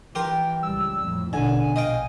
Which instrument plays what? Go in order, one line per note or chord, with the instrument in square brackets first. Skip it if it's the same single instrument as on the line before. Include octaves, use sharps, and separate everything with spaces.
[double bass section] E3 [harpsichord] G4 A#4 C6 [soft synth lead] G5
[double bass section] C#2 G3 [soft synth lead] E6
[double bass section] F2 A2
[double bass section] A1 B2 [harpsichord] D3 [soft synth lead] G#5
[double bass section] A#1 [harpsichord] D#5 F5 G5